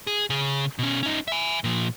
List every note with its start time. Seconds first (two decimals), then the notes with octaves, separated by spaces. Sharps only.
0.07 G#4
0.30 C#3 G#4
0.79 B2 C#4
1.03 C#4 D#4
1.28 E5 G#5
1.64 A#2 F3